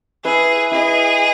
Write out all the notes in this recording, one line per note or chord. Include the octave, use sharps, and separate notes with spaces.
E4 G#4 B4 E5
E4 G#4 B4 D#5